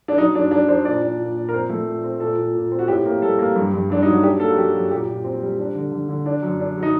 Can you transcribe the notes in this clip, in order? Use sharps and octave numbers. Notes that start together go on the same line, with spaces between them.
D4
F#3 D#4
F#2 D4
D4
D4 C5
A#2 D5
D4
A#2
A#2
A#4
C4 C5
A3
A#2
C4
A#2 A4
A#2
A#2
C4
F#4
A2 G4
A#3
G3 A4
A#3
G2
G2
G2 D4
F#3 D#4
F#4
D4 G4
A#3 A4
F#4
F#3 G4
F#2 F#4
A#2 G4
A#2
C4
G3
D4
D3
D3
D3
D4
F#2
D4
F#3
D#4